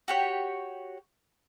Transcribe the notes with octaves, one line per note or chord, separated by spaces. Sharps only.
F#4 G4 C#5